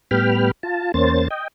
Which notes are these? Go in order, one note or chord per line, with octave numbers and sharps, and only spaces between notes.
A2 G3 B3 G5 B5 F6
F4 A5
E2 A#3 C#4 C5 A6
D#5 G5